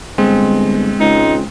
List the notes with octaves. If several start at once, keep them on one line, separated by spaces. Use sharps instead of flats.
G1 G#3 C4
C#2 D#4